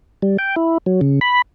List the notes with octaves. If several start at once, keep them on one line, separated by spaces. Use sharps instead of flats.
G3
G5
E4
F#3
C#3
B5